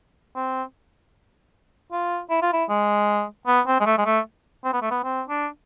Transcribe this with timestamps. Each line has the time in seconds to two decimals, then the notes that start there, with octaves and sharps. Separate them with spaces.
0.36 C4
1.92 F4
2.30 E4
2.42 F4
2.53 E4
2.69 G#3
3.47 B3
3.67 C4
3.80 G#3
3.86 A3
3.98 G#3
4.06 A3
4.65 C4
4.73 B3
4.82 A3
4.91 B3
5.04 C4
5.29 D4